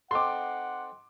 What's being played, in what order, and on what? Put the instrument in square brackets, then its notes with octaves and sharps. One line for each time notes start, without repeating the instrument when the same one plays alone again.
[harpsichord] C4 D#4 A4 [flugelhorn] F#5 [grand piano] C6 D6